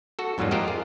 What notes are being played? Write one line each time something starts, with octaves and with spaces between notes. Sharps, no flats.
F#4 A4
F2 G#2 F#3 G3 A#3 F4
F4 G4 A#4 C5 D#5 F#5
G#4